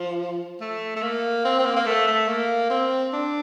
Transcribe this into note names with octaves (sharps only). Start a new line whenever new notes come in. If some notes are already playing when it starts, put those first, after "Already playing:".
Already playing: F3
A3
A3
A#3
C4
C4
A#3
A#3
A3
A3
A#3
C4
D4